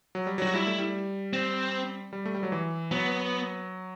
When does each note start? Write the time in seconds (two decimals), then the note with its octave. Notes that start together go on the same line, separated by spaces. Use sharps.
0.15 F#3
0.27 G3
0.38 F#3 F#4
0.55 G3 E4
0.67 A3
0.79 G3
1.33 C4
2.13 G3
2.25 A3
2.35 G3
2.43 F#3
2.52 E3
2.91 F#3 B3